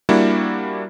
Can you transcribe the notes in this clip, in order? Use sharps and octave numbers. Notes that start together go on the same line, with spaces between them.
G3 A#3 D4 E4 F#4